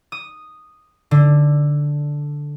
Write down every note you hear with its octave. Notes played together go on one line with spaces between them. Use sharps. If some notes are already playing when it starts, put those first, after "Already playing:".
D#6
D3